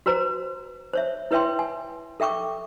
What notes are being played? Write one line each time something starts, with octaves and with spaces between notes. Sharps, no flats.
F#4 B4 C5 A#5
C5 C#5 E5
E4 B4 C#5 E5 G5 C6
G#5
A4 E5 G5 C#6 D6